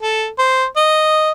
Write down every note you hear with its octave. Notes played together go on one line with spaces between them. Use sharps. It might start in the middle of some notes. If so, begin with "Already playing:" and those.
A4
C5
D#5